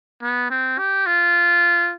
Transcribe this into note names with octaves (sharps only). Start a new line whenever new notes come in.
B3
C4
G4
F4